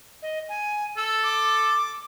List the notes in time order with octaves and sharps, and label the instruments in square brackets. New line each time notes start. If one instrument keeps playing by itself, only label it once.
[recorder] D#5
G#5
[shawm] A4 [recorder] E6
[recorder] D6